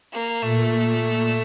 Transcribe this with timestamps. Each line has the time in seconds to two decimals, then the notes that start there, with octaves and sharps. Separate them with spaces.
0.13 A#3
0.41 A#2 A3
0.69 A#2